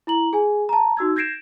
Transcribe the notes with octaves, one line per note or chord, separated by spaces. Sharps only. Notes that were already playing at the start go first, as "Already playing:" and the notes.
E4 A#5 F#7
G#4 G#5
A5 A#5
D#4 F#4 E6 G#6
G6 G#6 A#6 C7 D7 E7